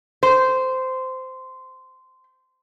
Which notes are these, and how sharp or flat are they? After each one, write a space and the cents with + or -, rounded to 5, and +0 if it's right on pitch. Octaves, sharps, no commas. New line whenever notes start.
C5 -15